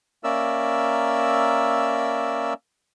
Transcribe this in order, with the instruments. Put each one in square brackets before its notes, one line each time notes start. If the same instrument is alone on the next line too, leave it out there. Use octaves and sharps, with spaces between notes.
[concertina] A#3 C#4 A#4 D5 E5 E6